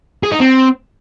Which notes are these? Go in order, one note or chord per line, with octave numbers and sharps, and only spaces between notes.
G#4
D#4
C4